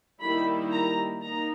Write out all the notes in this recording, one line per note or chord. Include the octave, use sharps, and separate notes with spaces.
D#3 G3 A#3 E4 B5
A#5
A#3 D#4 A#5